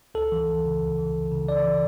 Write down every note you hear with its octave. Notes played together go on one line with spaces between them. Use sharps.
C#2 A4
E3
C#2
C#3
C#2
E3
C#2
C#3
C#2 D5
E3